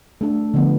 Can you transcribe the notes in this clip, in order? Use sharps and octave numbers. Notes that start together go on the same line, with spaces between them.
A3 D4 A4
D3 F3 B3